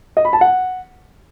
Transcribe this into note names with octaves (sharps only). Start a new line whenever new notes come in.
D#5
B5
A5
F#5